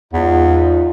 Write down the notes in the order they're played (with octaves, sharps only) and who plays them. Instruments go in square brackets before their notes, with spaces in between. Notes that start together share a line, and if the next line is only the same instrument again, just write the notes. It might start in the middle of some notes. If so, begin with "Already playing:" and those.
[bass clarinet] E2 [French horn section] G#2 D#4 F4